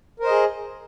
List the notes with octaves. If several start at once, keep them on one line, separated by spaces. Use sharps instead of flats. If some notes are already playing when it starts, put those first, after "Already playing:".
G#4 A#4 C5 D#5